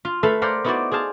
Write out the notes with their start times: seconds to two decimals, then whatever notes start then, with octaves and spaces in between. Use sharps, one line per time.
0.05 F4
0.23 A3 A4 B4 E5 F5
0.42 A#4 C5 D5 F5 F#5 B5
0.64 B3 D#4 E4 F#4 C5 D5
0.91 G#4 C5 F5 A5